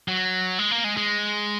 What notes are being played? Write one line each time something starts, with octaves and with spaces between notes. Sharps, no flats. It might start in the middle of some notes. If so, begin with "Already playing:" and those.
F#3
G#3
A#3
G#3
G#3